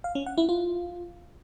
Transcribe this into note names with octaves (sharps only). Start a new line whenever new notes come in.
F5
C#4
F#5
E4
F4